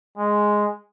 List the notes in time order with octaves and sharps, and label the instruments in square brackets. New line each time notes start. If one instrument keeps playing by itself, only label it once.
[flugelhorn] G#3